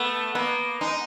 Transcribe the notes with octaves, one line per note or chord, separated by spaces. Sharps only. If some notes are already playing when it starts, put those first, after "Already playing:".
Already playing: A3 B3
A#3 B3
G#3 D#4